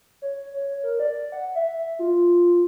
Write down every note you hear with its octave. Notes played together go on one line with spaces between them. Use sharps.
C#5
C#5
A#4
D5
F#5
E5
F4